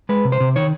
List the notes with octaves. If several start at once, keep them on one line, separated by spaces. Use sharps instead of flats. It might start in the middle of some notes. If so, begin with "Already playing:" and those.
G#3 B4
C3
C5
C3
D#3 C#5